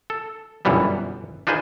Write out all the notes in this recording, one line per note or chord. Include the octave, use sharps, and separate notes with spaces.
A4
G1 F#2 B2 E3 G3 B3
D4 D#4 F4 G#4 B4 C5